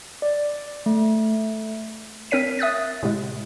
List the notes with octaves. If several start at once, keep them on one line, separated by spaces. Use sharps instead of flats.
D5
A3
C4 A#4 C#5 B6 D#7
E5 D#6 F#6 A6
A2 C3 G#3